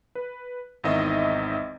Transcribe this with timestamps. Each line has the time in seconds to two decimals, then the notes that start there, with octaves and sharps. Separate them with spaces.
0.15 B4
0.84 G#1 E2 D#3 D#5 E5